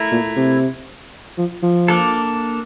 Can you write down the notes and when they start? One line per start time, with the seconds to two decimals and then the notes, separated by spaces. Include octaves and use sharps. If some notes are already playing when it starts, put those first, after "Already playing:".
Already playing: A3 E4 A#4
0.12 A#2
0.37 C3
1.38 F3
1.63 F3
1.88 A#3 D4 A4